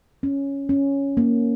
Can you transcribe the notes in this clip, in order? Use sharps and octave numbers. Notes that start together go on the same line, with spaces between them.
C#4
C#4
A#3